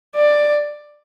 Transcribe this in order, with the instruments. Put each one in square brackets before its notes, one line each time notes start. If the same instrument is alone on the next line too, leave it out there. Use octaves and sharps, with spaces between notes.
[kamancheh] D5